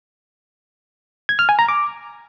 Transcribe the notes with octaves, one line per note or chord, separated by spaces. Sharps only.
G#6
F6
G#5
A#5
D6